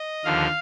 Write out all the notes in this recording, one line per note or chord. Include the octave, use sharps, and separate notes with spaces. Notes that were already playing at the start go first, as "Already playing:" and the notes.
Already playing: D#5
D#2 D3 F3 F5